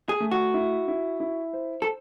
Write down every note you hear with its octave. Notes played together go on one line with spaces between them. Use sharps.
G#4
A3
F#4
E4
E4
E4
C5
A4